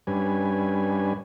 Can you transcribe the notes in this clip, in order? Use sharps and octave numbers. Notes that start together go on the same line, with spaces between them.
G2 G3 C#4 D4 B4 G#5